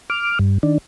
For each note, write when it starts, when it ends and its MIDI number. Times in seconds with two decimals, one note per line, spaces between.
0.10 0.39 86
0.10 0.39 89
0.39 0.58 43
0.63 0.78 51
0.63 0.78 62